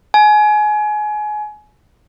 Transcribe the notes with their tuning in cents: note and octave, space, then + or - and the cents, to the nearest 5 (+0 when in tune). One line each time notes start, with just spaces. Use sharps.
G#5 +25